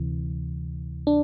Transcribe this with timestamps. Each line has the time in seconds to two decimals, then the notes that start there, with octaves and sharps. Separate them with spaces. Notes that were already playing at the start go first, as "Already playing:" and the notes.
Already playing: D2 C3 E3
1.07 D4